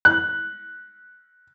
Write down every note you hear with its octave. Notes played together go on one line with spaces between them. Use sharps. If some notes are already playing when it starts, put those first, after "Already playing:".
F#6